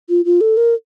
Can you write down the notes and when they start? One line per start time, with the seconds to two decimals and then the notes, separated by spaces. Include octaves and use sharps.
0.09 F4
0.25 F4
0.41 A4
0.57 A#4